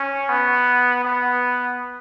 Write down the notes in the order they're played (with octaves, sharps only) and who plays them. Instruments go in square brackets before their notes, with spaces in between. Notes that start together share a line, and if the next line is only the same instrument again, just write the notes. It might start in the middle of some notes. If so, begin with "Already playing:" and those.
Already playing: [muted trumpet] C#4
B3
B3